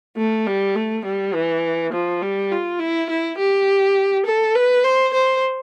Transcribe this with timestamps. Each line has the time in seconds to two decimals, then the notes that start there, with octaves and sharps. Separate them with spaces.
0.17 A3
0.46 G3
0.76 A3
1.05 G3
1.34 E3
1.93 F3
2.22 G3
2.51 F4
2.79 E4
3.10 E4
3.38 G4
4.26 A4
4.55 B4
4.84 C5
5.13 C5